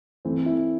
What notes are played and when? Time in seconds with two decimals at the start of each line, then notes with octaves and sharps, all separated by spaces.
0.25 E3 A3 C4
0.46 E4